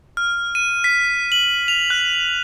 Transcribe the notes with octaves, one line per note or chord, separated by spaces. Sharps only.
F6
D#7
B6
F#7
F7
F#6